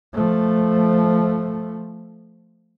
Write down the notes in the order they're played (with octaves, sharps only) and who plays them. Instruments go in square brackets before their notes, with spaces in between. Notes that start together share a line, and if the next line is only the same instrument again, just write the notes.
[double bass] F3 A3